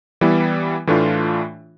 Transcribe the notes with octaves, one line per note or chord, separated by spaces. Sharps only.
E3 G3 B3 E4
A2 E3 A3 D4 F4